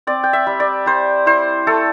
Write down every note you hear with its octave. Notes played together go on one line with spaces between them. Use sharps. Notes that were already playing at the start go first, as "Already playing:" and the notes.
C4 D5
G5
E5
G3
D5
G3 C5
E4 C5
A3 A4